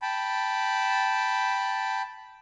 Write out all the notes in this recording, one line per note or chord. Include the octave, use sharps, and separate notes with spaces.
G5 A5 B5